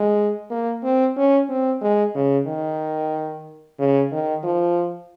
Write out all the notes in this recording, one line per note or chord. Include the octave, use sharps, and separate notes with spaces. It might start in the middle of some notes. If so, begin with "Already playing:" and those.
Already playing: G#3
A#3
C4
C#4
C4
G#3
C#3
D#3
C#3
D#3
F3